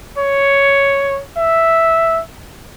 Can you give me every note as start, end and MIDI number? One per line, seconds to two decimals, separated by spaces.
0.18 1.21 73
1.37 2.21 76